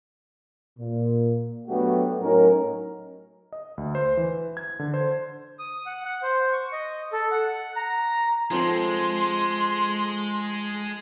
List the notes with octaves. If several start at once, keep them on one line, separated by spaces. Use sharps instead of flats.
A#2
F#3 A3 B3 D4 F#4 G4
A2 F#3 C#4 D#4 A#4
D#5
D2
C5
E3
G#6
D3
C5
D#6
F#5
F#5
C5
C#6
D#5
A4
F#5
A#5
F3 G#3 C4 A4 C6